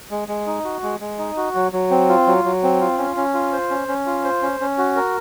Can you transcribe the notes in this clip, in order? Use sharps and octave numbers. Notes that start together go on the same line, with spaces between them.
G#3
G#3
D#4
F#4
G#3
G#3
D#4
F#4
F#3
F#3
C4
F4
F#3
F#3
C4
F4
C#4
C#4
F4
C5
C#4
C#4
F4
C5
C#4
C#4
F#4
A#4